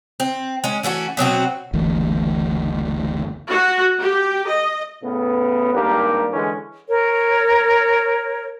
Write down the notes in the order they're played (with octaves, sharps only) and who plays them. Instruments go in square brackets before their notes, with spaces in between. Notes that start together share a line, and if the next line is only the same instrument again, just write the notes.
[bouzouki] C4
G#3 C#4
E3 A3 C#4 F#4
B2 F#3 C4 F#4
[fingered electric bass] F#1 D2 E3
[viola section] F#4
G4
D#5
[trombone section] A2 C#3 B3
G#1 G2 A#3 G4 A#4
D3 E3 G#3 C#4
[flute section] A#4 C#5